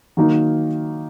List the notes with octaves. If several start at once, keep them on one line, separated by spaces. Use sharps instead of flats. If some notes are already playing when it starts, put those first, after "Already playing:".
D#3 F#3 A#3 D#4